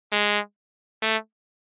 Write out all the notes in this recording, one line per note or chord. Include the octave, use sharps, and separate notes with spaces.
G#3
A3